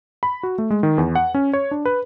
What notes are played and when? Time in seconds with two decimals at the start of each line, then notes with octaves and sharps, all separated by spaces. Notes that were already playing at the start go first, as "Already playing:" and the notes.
0.23 B5
0.43 F#4
0.58 A3
0.70 G#3
0.83 D#3
0.98 E2
1.15 F#5
1.34 C#4
1.53 C#5
1.71 D4
1.85 B4